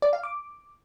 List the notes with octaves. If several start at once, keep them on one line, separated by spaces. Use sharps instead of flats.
D5
F5
D6